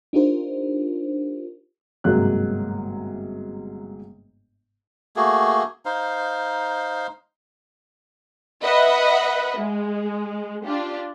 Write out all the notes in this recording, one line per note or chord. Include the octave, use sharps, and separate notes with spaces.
D4 D#4 F4 G4 A#4 C5
G1 G#2 C3 F#3 A#3 F#6
A3 A#3 F#4 G#4
D#4 C5 F5
B4 D#5 E5 F#5 B5
G#3
D4 F4 G4